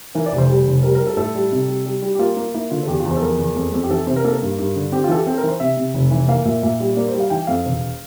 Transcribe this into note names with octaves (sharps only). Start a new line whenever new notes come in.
E3 A#4
D5
F1
C5
G3
F1
G3 A#4
A#4
G3
A4
A2 A4
G3
C3
G3
G3
G3
G4
A#3 F4
A#3
A#3 E4
D3 F4
A4
E2 G4
F4
E2
C5
A4
F3 A#4
E2
F2
F2
G4
E3 A4
C3 C5
A#4
A#3 A4
A#4
G2
G2
D3
C4 G4
F4
E3 A4
G4
C4 A4
A#4
E3
C5
C3 E5
C3
F1
E3
A#3 F5
A#2 E5
A#2 E5
G3
A#3 D5
C5
G3
F5
E3 G5
F2 F5
E1